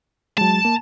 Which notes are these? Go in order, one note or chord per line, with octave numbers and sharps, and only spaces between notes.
F#3 G#3 A5
A#3